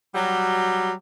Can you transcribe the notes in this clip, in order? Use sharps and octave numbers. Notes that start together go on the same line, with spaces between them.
F#3 G3